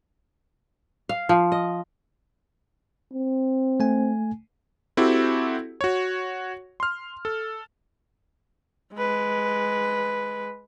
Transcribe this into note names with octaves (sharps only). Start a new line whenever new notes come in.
F5
F3
D#5
C4
A3 G#5
C4 E4 F#4 G4 A4
F#4 C#5
C6 F6
A4
G#3 B4